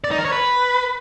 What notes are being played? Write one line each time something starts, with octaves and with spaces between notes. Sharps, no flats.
D5
D#4
A#4
C#5
B4